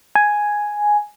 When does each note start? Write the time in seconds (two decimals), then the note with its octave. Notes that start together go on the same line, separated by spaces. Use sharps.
0.15 G#5